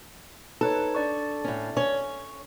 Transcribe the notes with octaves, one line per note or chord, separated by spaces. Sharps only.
D#4 A4 B4 C#5
D4 D5 C#6
A2 C#4
C#4 C#5